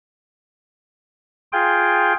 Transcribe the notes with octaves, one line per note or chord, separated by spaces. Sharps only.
F4 G#4 G5